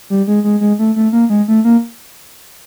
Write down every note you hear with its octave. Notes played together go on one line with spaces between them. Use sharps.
G3
G#3
G#3
G#3
A3
A3
A#3
G#3
A3
A#3